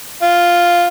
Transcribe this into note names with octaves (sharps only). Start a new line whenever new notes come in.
F4